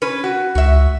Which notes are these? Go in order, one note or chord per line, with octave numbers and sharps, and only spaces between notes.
C#4 B4
F#4
C#2 F#4 E5